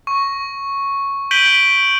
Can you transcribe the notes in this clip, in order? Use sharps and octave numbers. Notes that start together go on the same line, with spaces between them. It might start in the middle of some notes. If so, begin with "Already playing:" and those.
C#6
G6 B6 D7 D#7 F#7 G7